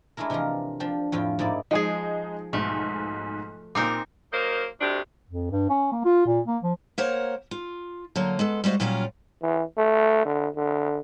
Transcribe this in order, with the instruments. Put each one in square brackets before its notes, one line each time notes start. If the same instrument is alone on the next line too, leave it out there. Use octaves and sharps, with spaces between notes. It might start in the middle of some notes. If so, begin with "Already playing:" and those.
[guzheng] G#3 A3 D4 E4 A#4
C3 E3 F3 F4 A#4
F3 D4 G4
F2 A2 F3 F4 G5
G#2 A#3 D#4 E4 D5
[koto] F3 G#4 [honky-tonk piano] G#3 D#4
[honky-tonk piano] B1 G#2 [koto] A3
[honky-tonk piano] A#2 D6 [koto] C4 D#4 A#4
[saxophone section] F#3 A#3 D#4 A#4 C5
D2 C3 D#3 D4 G4
[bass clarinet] F2
G2
C#4
A#3
F4
A#2
A#3
F3
[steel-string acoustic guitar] A#3 A#4 C5 C#5 F#5
F4
D3 F#3 A#3
G#3 B3 A4
G3 G#3 F#4 C5 F5
A#2 F#3 G3 C#4 F4 A#4
[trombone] E3
A3
D3
D3